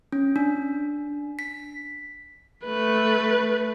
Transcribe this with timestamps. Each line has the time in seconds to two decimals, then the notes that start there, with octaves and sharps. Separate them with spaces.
0.12 C#4
0.36 D4
1.39 B6
2.65 A3 B4